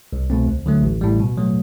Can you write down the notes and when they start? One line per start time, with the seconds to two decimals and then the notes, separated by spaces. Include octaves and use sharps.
0.13 C2
0.30 B2 A3 C4
0.48 D2
0.66 D3 F#3 A3
0.83 A1
1.01 A2 G3
1.20 B2
1.37 F#3 A3